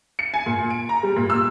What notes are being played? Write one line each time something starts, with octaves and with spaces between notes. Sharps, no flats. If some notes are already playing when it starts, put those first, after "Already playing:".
C#7
G#5
A#2
D7
A#5
G3
A#2
E6